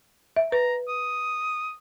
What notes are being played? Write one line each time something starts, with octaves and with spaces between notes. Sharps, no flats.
E5
B4 A#5
D#6